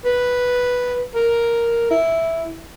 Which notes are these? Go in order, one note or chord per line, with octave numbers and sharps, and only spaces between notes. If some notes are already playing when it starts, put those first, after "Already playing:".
B4
A#4
E4